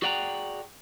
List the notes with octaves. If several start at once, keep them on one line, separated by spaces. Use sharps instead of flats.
F#4 G#4 D5 F#5 G5 A#5